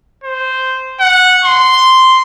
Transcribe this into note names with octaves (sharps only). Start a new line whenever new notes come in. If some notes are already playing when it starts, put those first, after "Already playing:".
C5
F#5
C6